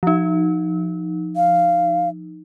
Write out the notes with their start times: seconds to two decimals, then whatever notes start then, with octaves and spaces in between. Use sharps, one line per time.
0.03 F3 D#4
1.36 F5